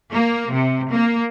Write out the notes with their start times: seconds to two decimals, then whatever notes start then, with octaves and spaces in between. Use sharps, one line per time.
0.12 A#3
0.51 C3
0.91 A#3